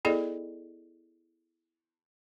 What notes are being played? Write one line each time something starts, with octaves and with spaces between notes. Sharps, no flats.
B3 E4 G#4 A4 D5 D#5